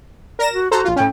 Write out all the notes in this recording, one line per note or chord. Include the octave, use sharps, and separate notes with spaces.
A#4 D5 A#6 E7
F#4
F#4 A4 C5 A#5
A#1 F4
A2 C#4 G5